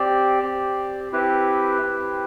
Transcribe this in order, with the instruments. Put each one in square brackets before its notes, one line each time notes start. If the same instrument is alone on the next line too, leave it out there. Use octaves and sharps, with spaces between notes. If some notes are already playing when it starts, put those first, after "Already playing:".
Already playing: [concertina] C4 G4 D5
C4 G4
C4 E4 G4 B4
C4 E4 G4